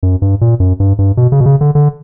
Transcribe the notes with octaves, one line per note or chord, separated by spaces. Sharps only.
F#2
G2
A#2
F#2
G2
G2
B2
C#3
B2
C#3
D3
D3